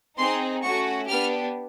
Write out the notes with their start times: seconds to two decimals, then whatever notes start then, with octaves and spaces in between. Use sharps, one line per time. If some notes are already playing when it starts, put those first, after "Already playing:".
0.18 C4 D#4 G#4 C6
0.63 A3 C#4 F#4 C#6
1.09 B3 D4 G4 F6